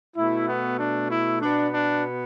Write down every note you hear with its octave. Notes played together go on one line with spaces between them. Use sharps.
B2 A3 E4
B3
D4
E4
B2 B3 D4
D4